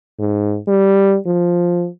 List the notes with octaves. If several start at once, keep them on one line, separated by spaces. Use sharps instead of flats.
G#2
G3
F3